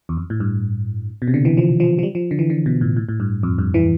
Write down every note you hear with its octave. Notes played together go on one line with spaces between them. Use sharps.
E2
F2
A2
G2
B2
C3
D3
E3
F3
F3
F3
G3
F3
D3
E3
D3
B2
A2
A2
A2
G2
F2
G2
E3